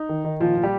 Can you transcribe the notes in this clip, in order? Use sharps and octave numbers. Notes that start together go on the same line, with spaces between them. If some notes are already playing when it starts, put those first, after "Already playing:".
Already playing: D#4
D#3
D#3
A#2 F3 F4
A#2
G3 G4